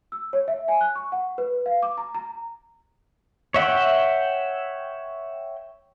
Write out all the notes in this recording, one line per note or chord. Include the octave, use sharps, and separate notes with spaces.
E6
C#5
E5
G#5
F#6
C#6
F#5
B4
F5
D6
A#5
A#5
C#5 E5 F#5 G5